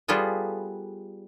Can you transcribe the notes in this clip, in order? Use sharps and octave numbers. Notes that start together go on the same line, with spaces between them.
G3 B3 F4 G#4 A4 B4